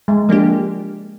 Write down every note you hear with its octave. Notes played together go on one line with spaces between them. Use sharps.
G#3
F3 A#3 D4 G4